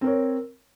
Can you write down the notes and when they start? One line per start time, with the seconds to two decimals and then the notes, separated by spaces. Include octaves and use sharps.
0.01 C4
0.04 A#4
0.07 C#5